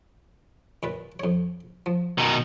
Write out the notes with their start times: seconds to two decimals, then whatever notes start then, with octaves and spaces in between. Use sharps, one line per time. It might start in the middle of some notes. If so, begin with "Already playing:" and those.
0.83 D#2 A#2 B4
1.20 F2 C#5
1.86 F3
2.18 B2 D#3